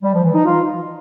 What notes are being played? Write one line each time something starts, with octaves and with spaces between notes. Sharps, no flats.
G3
F3
E3
D#4
F4